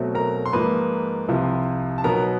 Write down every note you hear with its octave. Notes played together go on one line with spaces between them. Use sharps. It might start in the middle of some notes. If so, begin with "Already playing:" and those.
Already playing: B2 F#3 A3 C4
A#4 A#5
C6
G#2 F3 A#3 D#4 B4 B5
C2 C3 F3
A5
B2 F#3 B3 D#4 A#4 A#5